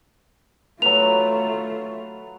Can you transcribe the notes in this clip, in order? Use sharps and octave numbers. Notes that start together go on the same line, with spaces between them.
F#3 A3 F4 B4 F7